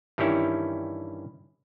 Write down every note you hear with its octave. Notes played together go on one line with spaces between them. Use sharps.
G2 D#3 E3 G3 C#4 E4